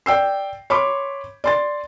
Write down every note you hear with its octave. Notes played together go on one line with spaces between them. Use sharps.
D5 G5 E6 C7
C#5 B5 C6 D6
D5 C6 A6